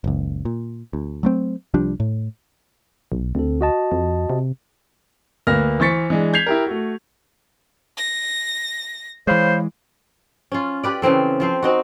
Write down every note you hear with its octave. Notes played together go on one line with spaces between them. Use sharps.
F#1 C#2
A#2
D2
F#3 A3 C4
C2 F3 G3 D4
A2
B1
D2 C4 A4
F#4 D#5 A5
F2
C3
D2 A#3 B4 F6 A#6
E3 C5 C#6 A6 B6 C#7
E3 G#3 D4
G6 G#6 B6 C7 F7
E4 G4 A#4
A3 F#4
A#6
E3 G#3 C5 C#5 F5 B5
C#4 F4
G4 B4 D5
C#3 E3 C4 A4
F3 C4 C5
C4 D#4 F#4